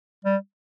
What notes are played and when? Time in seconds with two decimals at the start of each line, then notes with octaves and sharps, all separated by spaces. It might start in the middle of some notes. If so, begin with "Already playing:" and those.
0.25 G3